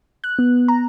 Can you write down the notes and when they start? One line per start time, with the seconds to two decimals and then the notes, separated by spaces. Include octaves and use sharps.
0.24 F#6
0.39 B3
0.68 A#5